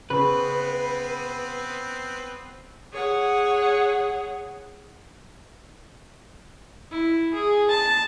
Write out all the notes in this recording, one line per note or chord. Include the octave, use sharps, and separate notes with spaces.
C#3 B3 C4 B4
G#4 C#5 F#5
E4
G#4
A5